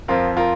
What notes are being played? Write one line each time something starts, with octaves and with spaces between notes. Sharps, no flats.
F2 F3 C4 F4 A#4
F4 A#4